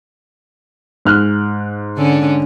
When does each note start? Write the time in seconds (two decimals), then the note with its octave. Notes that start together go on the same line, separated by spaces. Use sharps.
1.05 G#2 F6 F#6
1.97 D3 C#4